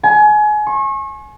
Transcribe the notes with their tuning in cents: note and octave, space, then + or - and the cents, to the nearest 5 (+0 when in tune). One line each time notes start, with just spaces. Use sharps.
G#5 +30
C#6 -35